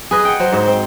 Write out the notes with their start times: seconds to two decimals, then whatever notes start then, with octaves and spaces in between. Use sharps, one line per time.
0.11 G#4 B4 D#5
0.25 F#5 G5
0.40 F#3 C5
0.53 G#2 C5
0.67 C4